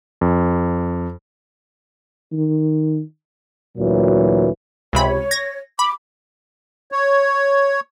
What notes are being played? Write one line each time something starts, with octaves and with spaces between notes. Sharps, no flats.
F2
D#3
D2 A#2 E3 F#3
C#2 C3 C#5 B5
G#6 A#6
B5 D6
C#5